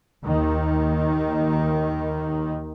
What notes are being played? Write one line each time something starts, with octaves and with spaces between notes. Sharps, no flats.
D#2 D#3